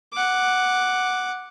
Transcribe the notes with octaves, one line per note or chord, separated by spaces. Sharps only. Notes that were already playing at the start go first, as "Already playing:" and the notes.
F#5 D6